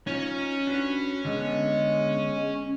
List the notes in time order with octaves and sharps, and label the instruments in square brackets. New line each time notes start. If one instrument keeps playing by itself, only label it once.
[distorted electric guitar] C#4 [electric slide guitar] D#4 F4
[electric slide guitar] D4 F#4 B4
[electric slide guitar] D3 B3 [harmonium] G#3